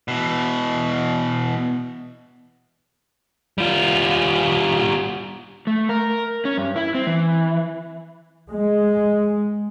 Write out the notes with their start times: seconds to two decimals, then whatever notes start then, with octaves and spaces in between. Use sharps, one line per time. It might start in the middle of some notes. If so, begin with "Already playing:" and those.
0.08 B2 E3
3.58 G3 F4
5.67 A3
5.89 A#4
6.45 C#4
6.58 G2
6.76 E4
6.95 C4
7.07 E3
8.52 G#3